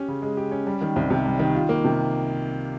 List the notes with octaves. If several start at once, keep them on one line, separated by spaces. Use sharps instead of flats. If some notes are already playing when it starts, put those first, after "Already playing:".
Already playing: C#4 G4
C#3
G#3
G4
C#4
G3
D#3
C2
C3
G3
D#3
F4
A#3
C3